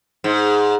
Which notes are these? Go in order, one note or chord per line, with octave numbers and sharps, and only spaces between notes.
G#2